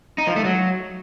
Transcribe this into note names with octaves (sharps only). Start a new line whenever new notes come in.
D#4
F3
A3
F#3